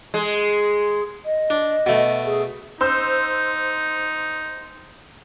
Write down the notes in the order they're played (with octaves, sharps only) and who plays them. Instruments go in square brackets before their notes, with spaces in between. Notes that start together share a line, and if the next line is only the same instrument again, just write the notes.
[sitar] G#3
[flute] D#5
[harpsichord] D4
B2 A3
[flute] G#4
[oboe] D#4 [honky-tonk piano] C5 E6 G6